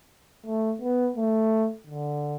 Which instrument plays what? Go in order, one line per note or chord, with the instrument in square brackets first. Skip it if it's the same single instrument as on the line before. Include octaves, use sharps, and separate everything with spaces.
[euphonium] A3
B3
A3
D3